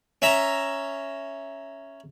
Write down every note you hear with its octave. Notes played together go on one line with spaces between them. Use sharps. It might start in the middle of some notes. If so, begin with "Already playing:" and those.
C#4 E5 A#5